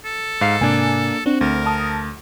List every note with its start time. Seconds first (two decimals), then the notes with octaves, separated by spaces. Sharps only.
0.05 A4
0.41 G#2 F5 C7
0.61 G#2 C3 A#3 D4 G#5
1.26 C4 D4 F#4
1.41 D2 A#4
1.66 A5 D#6